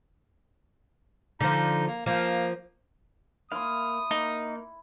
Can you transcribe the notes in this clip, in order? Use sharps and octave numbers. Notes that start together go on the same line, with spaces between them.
D3 F3 D#4
A#3
F3 A#3
A#3 E4 F5 C6 D#6
A#3 D#4